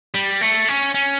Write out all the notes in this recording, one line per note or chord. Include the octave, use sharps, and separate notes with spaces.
G3
A3
C#4
C#4